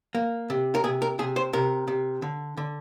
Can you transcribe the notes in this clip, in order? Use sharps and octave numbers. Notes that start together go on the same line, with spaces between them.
A#3
C3
A#4
C3 G#4
A#4
C3 G#4
C5
C3 A#4
C3
D3
D3